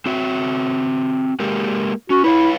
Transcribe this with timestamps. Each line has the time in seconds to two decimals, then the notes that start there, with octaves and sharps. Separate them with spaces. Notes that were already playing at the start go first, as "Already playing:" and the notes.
0.06 C4 F#4 E5
1.40 G#3 A#3 G4
2.10 C#4 F#4
2.24 E4 B4 C#5 F5